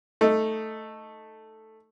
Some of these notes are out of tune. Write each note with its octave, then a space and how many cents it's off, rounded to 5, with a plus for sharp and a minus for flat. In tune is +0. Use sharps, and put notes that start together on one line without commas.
A3 +0 D#4 +10